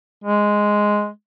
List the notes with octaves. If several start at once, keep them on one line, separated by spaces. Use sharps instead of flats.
G#3